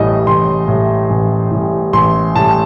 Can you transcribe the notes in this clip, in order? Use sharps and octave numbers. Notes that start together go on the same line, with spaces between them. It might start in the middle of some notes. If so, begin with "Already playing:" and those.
Already playing: A1 A2 G3 D#5
A1 C6
A2 G3
A1
A2 G3
A1 C6
A2 G3 A5